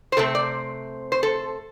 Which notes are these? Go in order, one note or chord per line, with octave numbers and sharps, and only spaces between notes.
C5
C3 A3 C4 A4
D5
C5
A4